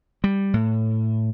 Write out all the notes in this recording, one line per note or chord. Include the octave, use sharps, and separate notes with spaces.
G3
A2